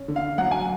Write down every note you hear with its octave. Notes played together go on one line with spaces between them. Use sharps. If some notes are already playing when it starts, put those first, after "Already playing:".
Already playing: C#4
D3
F5
F#3 F#5
G#5